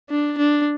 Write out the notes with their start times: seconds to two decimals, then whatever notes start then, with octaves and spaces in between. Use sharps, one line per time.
0.10 D4
0.39 D4